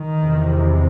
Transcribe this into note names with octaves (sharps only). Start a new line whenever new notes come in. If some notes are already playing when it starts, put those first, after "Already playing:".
Already playing: D#3
E2 C3